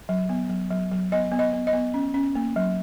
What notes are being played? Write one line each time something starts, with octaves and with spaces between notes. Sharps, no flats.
F#3
B3
F#3
F#3
F#3
B3 D#5
B3
D#5
B3
D#5
B3
C#4
C#4
A#3
F#3